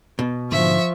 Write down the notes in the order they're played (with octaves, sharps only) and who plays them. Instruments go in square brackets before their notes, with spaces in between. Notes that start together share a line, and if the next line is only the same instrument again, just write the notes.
[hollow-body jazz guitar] B2
[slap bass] G#2 D3 [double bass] F3 [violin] E5 C#6